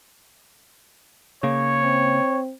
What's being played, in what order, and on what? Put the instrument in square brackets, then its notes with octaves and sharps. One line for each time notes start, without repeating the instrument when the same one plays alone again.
[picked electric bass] C#3 A#3 [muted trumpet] C#5
[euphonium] C4